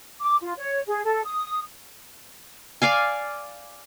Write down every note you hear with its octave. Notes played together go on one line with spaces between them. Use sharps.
D6
F4
C#5
G#4
A4
D#6
D5 F5 G#5